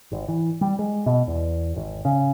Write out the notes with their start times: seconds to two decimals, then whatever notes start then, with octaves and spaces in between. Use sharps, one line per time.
0.12 G#1
0.28 E3
0.61 G3
0.79 G#3
1.06 B2
1.27 E2
1.76 G#1
2.05 C#3